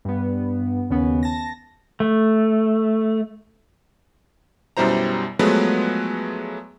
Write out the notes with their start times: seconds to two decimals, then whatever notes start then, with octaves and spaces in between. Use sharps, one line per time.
0.05 G2 B3
0.90 D#2 C#3 B3
1.23 A5 A#6
2.00 A3
4.77 F#2 B2 G3 E4 C5 A#5
5.39 F3 F#3 G#3 A3 B3 B4